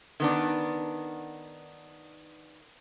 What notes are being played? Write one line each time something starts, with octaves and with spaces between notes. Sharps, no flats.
D#3 B3 D4